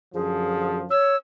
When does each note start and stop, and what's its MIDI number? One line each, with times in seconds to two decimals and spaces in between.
0.14 0.89 42
0.14 0.89 50
0.14 0.89 53
0.14 0.79 68
0.90 1.16 73
0.90 1.17 88